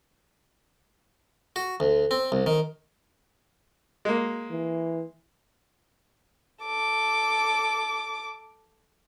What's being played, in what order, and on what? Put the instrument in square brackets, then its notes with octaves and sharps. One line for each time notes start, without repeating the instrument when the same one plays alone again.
[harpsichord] F#4
D2
C4
C2
D#3
[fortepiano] G#3 A#3
[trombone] E3
[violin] A4 D6